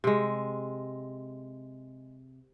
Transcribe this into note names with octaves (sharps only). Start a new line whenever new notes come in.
C3 G#3